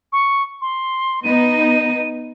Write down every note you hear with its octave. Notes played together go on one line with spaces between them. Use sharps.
C#6
C6
B3 D#4 D#7